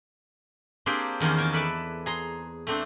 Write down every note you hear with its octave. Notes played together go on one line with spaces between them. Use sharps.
A#3 C4 D4 G4 G#4 C5
E2 D#3 A#3 C#4 C5
A#4 G#5 A5
A4 B4 D5 E5
G#4 A#5 C6
A3 C4 D4